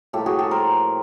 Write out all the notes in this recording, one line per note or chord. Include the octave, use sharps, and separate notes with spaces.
A2 F3 A#3 G4 A4
F#4 G#4
G4 A4
A#4 C5